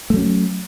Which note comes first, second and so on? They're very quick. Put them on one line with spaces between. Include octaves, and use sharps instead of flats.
A3 F#3 C#4